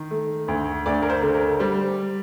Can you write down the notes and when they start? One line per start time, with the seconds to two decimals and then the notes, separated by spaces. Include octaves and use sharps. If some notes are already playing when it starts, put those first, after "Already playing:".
Already playing: D#3
0.11 A3
0.48 D2
0.86 D2 D5
1.02 A#4
1.10 C5
1.22 D3
1.34 A#4
1.59 G3 C5